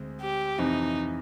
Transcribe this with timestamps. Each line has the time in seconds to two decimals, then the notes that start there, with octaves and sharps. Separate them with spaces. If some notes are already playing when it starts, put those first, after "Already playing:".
Already playing: D2 G#3 C4
0.21 G4
0.58 F2 C3 E3 D#4